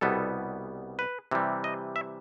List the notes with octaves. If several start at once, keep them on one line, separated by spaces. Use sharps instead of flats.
C2 B2 G3 B3 A4
B4
C3 E3 G3
D#5
E5